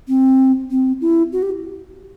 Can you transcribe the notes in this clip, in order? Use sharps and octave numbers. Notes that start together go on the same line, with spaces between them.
C4
C4
E4
F#4
G4